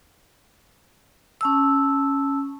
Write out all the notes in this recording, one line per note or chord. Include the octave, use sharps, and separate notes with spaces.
C#4 A5 E6